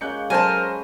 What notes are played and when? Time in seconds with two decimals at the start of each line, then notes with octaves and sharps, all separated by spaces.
0.01 G#3 A#3 C#4 F#6 G6 C#7
0.30 F#3 A4 A#4 C5 G#5 A5
0.66 B4